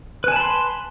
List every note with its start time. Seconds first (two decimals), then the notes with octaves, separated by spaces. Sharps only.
0.24 B4
0.28 G#5
0.32 A5
0.36 B5
0.40 C6